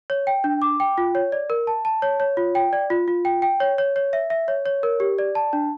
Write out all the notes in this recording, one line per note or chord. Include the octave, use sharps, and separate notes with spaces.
C#5
G5
D4
D6
G5
F4
C#5
D5
A#4
A5
A5
C#5
C#5
F4
G5
D5
F4
F4
G5
G5
C#5
C#5
C#5
E5
E5
C#5
C#5
A#4
G4
D5
A5
D4